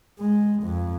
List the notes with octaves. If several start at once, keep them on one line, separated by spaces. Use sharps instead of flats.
G#3
F2